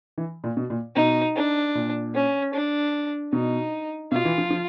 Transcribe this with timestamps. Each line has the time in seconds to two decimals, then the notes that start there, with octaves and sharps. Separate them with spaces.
0.18 E3
0.44 A#2
0.57 B2
0.70 A#2
0.96 B2 D#4
1.36 D4
1.75 A#2
2.15 C#4
2.54 D4
3.33 B2 D#4
4.12 B2 F4
4.25 E3
4.38 F3
4.50 F3